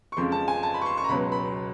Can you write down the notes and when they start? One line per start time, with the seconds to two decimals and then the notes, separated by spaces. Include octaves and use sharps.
0.12 C#6
0.17 F2 C#3 F3 G#3 C6
0.32 A5
0.48 G#5
0.63 A5
0.74 B5
0.81 C#6
0.86 C6
0.98 C#6
1.04 A#5
1.09 C#2 B2 F#3 B5
1.32 B5